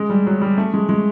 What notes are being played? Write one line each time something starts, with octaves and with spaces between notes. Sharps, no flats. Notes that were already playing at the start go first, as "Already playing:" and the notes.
Already playing: G#3
G3
F#3
G3
A3
G#3
G#3